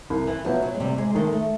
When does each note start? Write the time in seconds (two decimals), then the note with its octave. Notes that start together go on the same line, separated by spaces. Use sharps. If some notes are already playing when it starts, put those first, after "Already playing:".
0.10 C2
0.27 E3
0.45 B2 F3 F#3
0.62 F#3
0.75 G#3
0.80 C3 G3
0.98 G#3
1.15 D#3 G#3 A3
1.33 A3